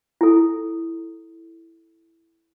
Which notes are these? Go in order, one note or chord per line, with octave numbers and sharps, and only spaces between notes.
E4 A4